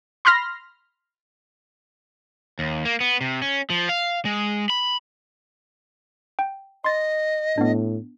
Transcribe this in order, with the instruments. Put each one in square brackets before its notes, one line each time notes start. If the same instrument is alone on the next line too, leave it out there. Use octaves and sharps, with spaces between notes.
[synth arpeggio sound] B5 C6 F6 A#6
[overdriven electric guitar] D#2
A#3
B3
C3
C#4
F3
F5
G#3
B5
[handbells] G5
[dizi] D#5 [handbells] C6 A6
[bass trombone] A2 [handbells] B3 D4